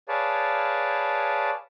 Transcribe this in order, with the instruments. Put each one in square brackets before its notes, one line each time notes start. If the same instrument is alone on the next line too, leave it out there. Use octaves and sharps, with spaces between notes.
[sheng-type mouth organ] G#4 B4 C#5 D5 F5 A5